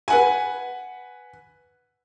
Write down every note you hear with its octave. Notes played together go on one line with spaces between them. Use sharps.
B4 F#5 G#5